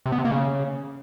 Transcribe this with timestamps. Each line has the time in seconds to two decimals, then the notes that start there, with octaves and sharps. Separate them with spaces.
0.06 C3
0.12 B3
0.18 C3
0.25 A#3
0.31 C#3